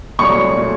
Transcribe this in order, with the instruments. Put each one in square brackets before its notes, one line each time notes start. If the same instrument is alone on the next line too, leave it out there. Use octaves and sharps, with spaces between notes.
[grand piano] C2 A#2 F#3 A3 [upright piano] C#6
[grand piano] A#2 F#3 A3